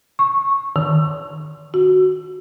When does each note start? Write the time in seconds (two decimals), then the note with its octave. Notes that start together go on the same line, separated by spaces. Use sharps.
0.19 C#6
0.76 D#3
1.74 F#4